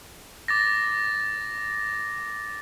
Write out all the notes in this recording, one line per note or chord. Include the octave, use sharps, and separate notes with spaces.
D6 A6 A#6